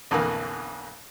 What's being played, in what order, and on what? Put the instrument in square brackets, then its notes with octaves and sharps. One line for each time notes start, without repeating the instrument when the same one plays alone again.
[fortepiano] B1 F2 D3 E3 A#3